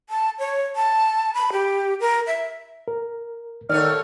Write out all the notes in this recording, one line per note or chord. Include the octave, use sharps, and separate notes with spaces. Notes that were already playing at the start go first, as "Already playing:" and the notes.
A5
C#5
A5
B5
G4
A#4
E5
A#4
D#2 D#3 A3 C#5 D5 F6